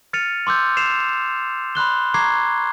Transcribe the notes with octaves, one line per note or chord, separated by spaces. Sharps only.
F6 A6 C#7 D#7 F7
C6 D6 E6 G6
D6 C7 E7 F7
B5 C6 F#6 G7
A#5 C#6 D6 G#6 C7